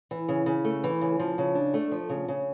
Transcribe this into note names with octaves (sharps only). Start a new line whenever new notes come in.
E3
C#3
C#3
A3
E3
C#3
F3
C#3
D4
A3
F3
C#3
C#3